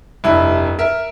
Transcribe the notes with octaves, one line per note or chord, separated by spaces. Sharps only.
F1 G2 E4
A#4 E5